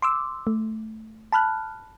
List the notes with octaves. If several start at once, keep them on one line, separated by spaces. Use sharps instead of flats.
C6 D6 E6
A3
A5 B5 F6 F#6